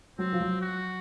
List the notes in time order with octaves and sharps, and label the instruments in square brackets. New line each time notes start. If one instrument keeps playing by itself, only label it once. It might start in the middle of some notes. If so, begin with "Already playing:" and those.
[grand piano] F#3 [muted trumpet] C4
[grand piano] F3
F#3
[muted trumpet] F#4